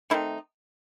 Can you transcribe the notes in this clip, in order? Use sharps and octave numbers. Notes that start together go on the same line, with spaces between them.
D#3 A3 C4 D#4 E4